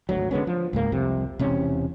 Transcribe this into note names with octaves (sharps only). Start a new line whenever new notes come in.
G#1 D2 F#3
D3 G#3 B3 C#4
F3
C#2 G#2 A#3
C2 F2 C3
E1 C3 C#4